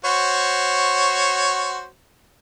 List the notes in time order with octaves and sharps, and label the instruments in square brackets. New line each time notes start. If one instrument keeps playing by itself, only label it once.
[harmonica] F#4 C5 C#5